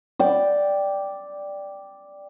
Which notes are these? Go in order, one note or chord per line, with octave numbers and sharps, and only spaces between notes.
D5 G5